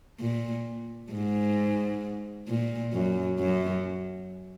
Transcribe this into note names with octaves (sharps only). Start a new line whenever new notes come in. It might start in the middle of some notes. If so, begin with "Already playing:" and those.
A#2
G#2
A#2
F#2
F#2